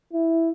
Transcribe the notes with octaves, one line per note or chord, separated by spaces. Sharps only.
E4